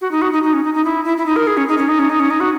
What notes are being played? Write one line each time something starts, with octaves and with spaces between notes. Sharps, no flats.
F#4
D#4
F#4
D#4
D#4
C#4
D#4
D#4
E4
E4
E4
D#4
A#4
G#4
C#4
D#4
C#4
D#4
C#4
D#4
C#4
D#4
F#4